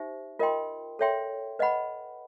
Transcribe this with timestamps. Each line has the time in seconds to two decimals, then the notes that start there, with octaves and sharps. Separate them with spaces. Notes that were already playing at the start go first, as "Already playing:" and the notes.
Already playing: D#4 G4 C5 E5
0.39 F4 A#4 D#5 G5 C6
0.99 A4 C#5 E5 G5 C6
1.59 B4 D#5 F#5 B5